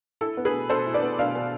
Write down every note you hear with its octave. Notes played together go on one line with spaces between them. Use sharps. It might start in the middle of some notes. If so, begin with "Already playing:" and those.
E4 A4
B3
G#4 B4
B2
B2 A4 C5
E4
B4 D5
B3
B2 D5 F5
B2